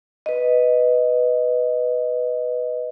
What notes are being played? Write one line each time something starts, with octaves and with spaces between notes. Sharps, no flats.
B4 D#5